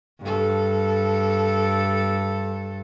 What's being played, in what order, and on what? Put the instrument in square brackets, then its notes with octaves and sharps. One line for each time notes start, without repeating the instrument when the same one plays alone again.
[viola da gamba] G2 A4